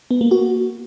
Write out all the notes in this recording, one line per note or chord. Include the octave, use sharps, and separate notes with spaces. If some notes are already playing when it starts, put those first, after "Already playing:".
B3
A#3
F#4